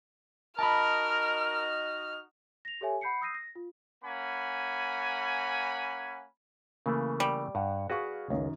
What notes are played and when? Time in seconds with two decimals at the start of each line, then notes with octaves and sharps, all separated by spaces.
0.59 D#4 F#4 A#4 D#5 A5 B5 F6
2.65 A#6 F7
2.81 G4 A4 C#5 E5 G#5
3.01 F#5 B5 G6 C7 C#7
3.21 D#6 E6 G6 A#6 C7 D#7
3.35 A#6
3.55 F4
4.04 A#3 C#4 F#5 G#5 B5
6.86 C#3 E3 A3 A#3
7.20 G3
7.55 G2 F#5
7.90 F#4 G#4 B4 F5 C#6
8.30 C#2 F#2 D#3